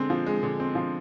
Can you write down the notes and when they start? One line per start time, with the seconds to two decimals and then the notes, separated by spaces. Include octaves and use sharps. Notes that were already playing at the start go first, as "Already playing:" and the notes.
Already playing: D3 G#3 C4 G#4
0.10 F3
0.26 G#3
0.43 D3
0.60 C4
0.75 F3